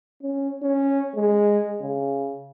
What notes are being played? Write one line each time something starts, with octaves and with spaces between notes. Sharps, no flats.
C#4
C#4
G#3
C#3